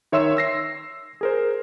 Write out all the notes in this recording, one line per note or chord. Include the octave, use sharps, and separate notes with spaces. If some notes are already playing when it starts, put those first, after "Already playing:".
D#3 C#5 E5 C6 E6 E7
E6 A#6 C7
G#4 A#4 C5